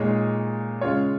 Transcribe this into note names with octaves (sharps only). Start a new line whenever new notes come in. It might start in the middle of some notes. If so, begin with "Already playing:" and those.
Already playing: A#2 G#3 D#4 C#5
C#3 G#3 F4 C#5